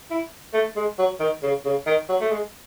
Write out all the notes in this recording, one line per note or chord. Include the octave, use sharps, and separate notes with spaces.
E4
A3
G#3
F#3
D#3
C#3
C#3
D#3
F#3
A3
G#3